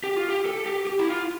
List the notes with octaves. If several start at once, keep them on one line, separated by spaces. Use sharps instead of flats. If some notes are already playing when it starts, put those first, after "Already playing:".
G4
F4
G4
A4
G4
G4
E4
F4